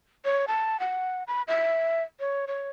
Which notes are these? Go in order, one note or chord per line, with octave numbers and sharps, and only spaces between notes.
C#5
A5
F#5
B5
E5
C#5
C#5